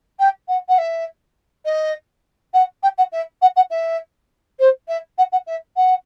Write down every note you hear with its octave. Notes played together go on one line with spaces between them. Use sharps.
G5
F#5
F#5
E5
D#5
F#5
G5
F#5
E5
F#5
F#5
E5
C5
E5
F#5
F#5
E5
F#5